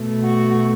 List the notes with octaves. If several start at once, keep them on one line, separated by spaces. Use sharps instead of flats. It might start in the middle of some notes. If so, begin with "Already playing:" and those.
Already playing: B2 A3
F#4